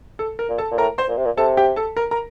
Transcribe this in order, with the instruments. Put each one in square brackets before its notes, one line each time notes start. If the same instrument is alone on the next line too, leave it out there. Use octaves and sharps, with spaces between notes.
[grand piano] A4
A#4
[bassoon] A#2
[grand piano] A4 A5
[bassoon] A#2
[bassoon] A2 [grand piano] A#4 A#5
[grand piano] C5 C6
[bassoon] A#2
C3
A#2
[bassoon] C3 [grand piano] A4 A5
[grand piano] G4 G5
A4 A5
A#4 A#5
A#4 A#5